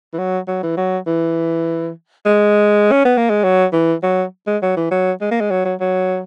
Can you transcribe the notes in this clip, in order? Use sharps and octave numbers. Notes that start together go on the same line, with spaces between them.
E3
F#3
F#3
E3
F#3
E3
G#3
C#4
B3
A#3
G#3
F#3
E3
F#3
G#3
F#3
E3
F#3
G#3
A#3
G#3
F#3
F#3
F#3